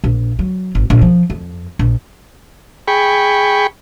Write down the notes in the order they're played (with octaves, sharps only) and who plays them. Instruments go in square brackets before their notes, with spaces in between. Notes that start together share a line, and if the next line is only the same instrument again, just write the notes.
[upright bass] A#1
F#3
G#1
A#1
F3
F2
A#1
[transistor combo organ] G#4 G5 B5 C#6